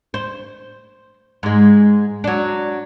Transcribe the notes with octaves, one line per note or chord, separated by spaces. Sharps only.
C5
G#2 G#3
F#3 D4